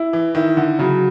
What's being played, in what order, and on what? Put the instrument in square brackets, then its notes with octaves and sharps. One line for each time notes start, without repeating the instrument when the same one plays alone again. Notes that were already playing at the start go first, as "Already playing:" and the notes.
Already playing: [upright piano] E4
[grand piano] E3
[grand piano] D#3 [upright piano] E4
[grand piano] D3
[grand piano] C#3 [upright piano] F#3